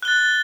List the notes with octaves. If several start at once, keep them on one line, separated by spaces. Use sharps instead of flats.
F#6 A6 G7